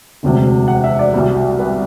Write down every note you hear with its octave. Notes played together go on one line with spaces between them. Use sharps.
E1 D2 C3 F#3
F#5
E5
D5
C2 B2 G3
B4